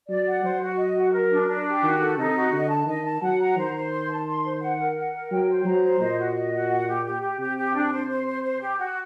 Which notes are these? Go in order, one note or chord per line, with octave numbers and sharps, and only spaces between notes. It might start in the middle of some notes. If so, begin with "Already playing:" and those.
F#3 D5
F#5
F#3 C5
F#4
D#5
F#4
A#4
D4
D4
G4
D#3 F#4
A4
C3 D#4
F#4
D3 D#5
A5
D#3 D#5
A5
F#3 F#5
A#5
D#3 C5
C5
C6
A5
C6
C5
F#5
A#4
F#5
A#4
F#3 G5
C5
F#3 A#5
C5
A#2 D#5
F#4
D#5
F#4
F#5
G4
G4
G4
C3 G4
G4
D4
C5
C5
C5
C5
G4
F#4